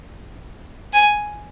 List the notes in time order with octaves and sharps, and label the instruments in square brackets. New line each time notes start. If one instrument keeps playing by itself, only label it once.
[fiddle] G#5